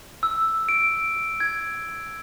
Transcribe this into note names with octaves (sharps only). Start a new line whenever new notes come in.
E6
D7
G#6